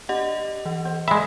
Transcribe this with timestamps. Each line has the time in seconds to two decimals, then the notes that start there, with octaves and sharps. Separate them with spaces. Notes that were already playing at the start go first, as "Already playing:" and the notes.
0.09 D4 G4 D#5 F#5
0.66 E3
0.85 C5
1.08 G#3 D5 E5 G5 B5